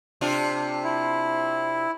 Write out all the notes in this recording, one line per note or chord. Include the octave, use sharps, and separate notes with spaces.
C3 D4 F4
E4